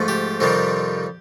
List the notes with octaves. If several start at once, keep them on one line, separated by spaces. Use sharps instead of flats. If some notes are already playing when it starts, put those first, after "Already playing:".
Already playing: G#2 F3 A3
G4
F2 C3 D#3 G3